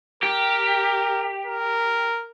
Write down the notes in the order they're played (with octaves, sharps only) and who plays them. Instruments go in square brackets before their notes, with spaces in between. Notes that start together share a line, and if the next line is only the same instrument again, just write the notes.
[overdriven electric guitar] G4 [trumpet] A#4
[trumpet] A#4